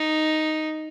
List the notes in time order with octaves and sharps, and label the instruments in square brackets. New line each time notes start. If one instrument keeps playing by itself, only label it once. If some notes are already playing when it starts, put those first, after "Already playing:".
Already playing: [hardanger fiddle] D#4